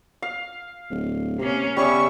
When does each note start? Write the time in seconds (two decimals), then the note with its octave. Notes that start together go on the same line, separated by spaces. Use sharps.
0.22 F5
0.91 D1
1.39 C3 A#3 C#4
1.77 C#3 G3 B3 C#4 E5 C#6